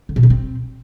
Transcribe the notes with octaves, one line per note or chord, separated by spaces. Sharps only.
D3
B2
D4
C4